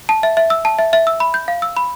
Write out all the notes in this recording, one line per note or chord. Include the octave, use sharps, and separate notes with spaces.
A5
E5
E5
E6
A5
E5
E5
E6
B5
G6
F5
E6
B5